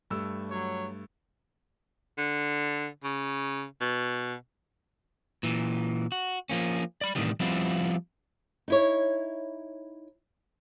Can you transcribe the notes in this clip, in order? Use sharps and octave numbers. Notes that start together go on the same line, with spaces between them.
G2 A3 E6
F#3 C#5
D3
C#3
B2
A#2 E3
F#4
F3 A#3 C#4
D5 B5
A2 C3 D#3 E3 G3
F3 G3 B3 C4 E4 F4
D#4 E4 C#5